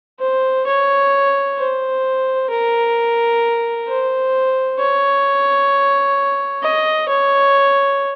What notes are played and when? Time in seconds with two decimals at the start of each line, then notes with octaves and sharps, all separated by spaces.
0.20 C5
0.66 C#5
1.58 C5
2.50 A#4
3.88 C5
4.79 C#5
6.63 D#5
7.08 C#5